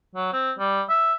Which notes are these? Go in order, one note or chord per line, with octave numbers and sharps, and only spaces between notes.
F#3
C4
G3
E5